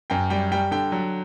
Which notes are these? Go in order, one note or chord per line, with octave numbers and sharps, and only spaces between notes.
F#2 G5
G3 G5
G3 G5
D3 G5
F#3